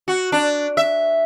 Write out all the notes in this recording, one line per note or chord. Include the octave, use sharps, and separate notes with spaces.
F#4
D4
E5